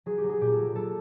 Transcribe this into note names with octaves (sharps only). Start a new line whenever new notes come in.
F#3 G#4
G4
F#3
G#4
A#2 G4
A4
F#3
F#3 A4